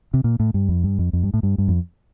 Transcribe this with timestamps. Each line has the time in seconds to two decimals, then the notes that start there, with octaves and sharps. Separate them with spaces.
0.14 C3
0.24 A#2
0.40 A2
0.54 G2
0.69 F2
0.84 G2
0.99 F2
1.13 F2
1.23 G2
1.34 A2
1.43 G2
1.58 G2
1.68 F2